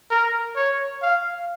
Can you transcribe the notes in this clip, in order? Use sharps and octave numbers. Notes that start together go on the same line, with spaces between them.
A#4
C#5
F5